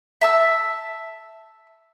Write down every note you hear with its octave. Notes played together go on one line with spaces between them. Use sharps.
E5 A5 E6